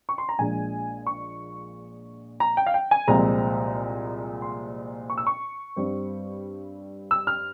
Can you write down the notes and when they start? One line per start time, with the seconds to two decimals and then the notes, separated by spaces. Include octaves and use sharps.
0.09 C#6
0.18 C6
0.29 A#5
0.39 A#1 A#2 G#3 G#5
1.07 C#6
2.40 A#5
2.57 G5
2.66 F5
2.74 G5
2.91 G#5
3.07 C2 A#2 F3 G#3 C4 A#5
4.42 C6
5.10 C#6
5.18 E6
5.27 C#6
5.76 G2 G3 C4
7.11 E6
7.27 F6